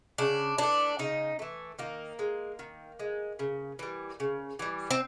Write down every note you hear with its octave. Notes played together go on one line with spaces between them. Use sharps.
C#3 D4
E3 A3 D4
C#3 D#4
E3 A3
D#3 A#3
G#3
D#3
G#3
C#3
E3 G3
C#3
E3 G3
C4